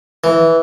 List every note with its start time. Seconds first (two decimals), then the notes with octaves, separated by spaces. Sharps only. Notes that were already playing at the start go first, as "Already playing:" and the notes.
0.24 E3